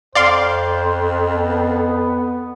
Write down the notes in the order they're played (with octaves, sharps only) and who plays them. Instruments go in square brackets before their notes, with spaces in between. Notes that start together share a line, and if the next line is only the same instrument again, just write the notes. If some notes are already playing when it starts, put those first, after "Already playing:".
[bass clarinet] F2 [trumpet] C5 [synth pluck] D5 F5 C6
[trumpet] B3